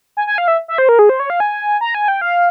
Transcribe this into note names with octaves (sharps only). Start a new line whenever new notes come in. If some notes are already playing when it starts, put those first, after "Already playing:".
G#5
G#5
F5
E5
E5
C5
A#4
G#4
C5
C#5
F5
G#5
A#5
G#5
G5
F5